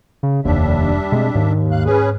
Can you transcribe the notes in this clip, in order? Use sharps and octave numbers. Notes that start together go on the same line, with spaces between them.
C#3
F1 D#2 G3 D4 E5
B2 G#3 C4
D#2 G#2
F5 F#6
C#4 G#4 B4